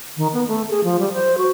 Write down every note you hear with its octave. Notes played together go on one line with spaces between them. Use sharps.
D#3
B3
A3
G#4
F3
G3
C5
F#4